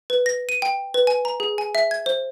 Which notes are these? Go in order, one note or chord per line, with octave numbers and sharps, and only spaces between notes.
B4
A#6
D#7
G5
B4
G#5
A#5
G#4
G#5
E5
G#6
C5